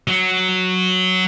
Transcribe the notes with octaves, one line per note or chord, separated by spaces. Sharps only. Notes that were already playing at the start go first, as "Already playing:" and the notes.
F#3